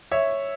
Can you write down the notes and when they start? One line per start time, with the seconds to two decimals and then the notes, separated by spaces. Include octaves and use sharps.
0.12 C#5 E5